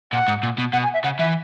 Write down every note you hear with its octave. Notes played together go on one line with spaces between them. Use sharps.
A#2 F#5
G#2
A#2
B2
B2 F#5
G#5
E5
C#3 F#5
E3 E5